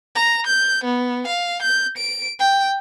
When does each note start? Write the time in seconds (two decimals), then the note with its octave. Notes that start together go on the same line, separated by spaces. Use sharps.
0.15 A#5
0.47 G6
0.84 B3
1.27 F5
1.63 G6
1.97 D7
2.40 G5